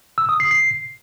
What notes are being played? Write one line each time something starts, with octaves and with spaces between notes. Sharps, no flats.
E6
D#6
C7
C7